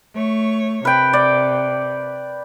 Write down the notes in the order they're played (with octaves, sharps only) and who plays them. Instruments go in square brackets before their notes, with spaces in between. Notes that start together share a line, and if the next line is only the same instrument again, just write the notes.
[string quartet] A3 C#5
[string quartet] C3 [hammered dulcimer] B4 G5
[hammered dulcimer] D5